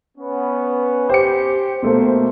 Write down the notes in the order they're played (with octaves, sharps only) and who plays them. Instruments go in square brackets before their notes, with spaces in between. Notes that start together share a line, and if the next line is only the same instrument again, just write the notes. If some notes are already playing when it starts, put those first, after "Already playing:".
[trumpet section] B3 C#4
[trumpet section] G4 [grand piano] C5 C#7
[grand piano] B2 A3 A#3 [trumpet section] C5